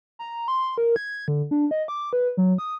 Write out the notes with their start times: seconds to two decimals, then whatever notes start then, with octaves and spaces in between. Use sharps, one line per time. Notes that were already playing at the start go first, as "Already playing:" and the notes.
0.19 A#5
0.48 C6
0.78 A#4
0.96 G#6
1.28 D3
1.51 D4
1.71 D#5
1.88 D6
2.13 B4
2.37 F#3
2.58 D#6